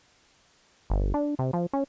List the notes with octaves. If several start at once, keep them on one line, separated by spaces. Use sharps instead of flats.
G1
D4
C3
F3
C#4